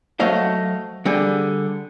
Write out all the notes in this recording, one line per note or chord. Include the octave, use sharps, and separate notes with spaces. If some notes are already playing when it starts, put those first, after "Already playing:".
F#3 A3 C5 D#5 F5
D3 G3 G#4